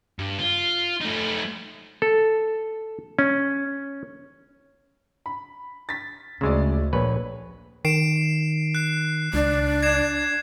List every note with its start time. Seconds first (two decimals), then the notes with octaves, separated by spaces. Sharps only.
0.19 G2
0.39 F4
1.01 A3 D#4
2.02 A4
3.19 C#4
5.26 B5
5.89 A6 B6
6.41 D2 C#3 G#3 D5 C6 E6
6.93 A#1 B4 C#5
7.85 D#3 C7 D7 E7
8.75 F#6 C7
9.34 C#2 D4
9.83 G#6 C7 E7